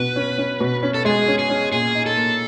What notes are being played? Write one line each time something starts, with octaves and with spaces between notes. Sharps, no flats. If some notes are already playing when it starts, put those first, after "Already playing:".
Already playing: B2 F#4 B4
C#4
C#4
B2
C#4
A4
G#3 G#4
C#4
G#4
C#4
A#2 G#4
D#4
A4
A#3